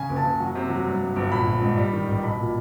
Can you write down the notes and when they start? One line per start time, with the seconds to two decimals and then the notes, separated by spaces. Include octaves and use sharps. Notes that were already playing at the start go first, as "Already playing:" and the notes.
Already playing: C#3 G#5
0.09 F#1
0.16 A5
0.24 F#1
0.40 F#3
0.55 C3
0.70 F#3
0.86 G2
1.01 G2
1.16 G1
1.32 A#1 B5
1.47 A#1
1.62 G#2
1.78 G3
1.93 D#3
2.08 A1
2.23 B1 B5
2.39 A#2